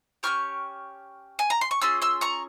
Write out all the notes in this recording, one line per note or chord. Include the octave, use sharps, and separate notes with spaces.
C#4 E4 G4 C#6 F6
G#5
A#5
C6
C#6
C#4 F4 G#4 C6 E6
C6 E6
A#5 C#6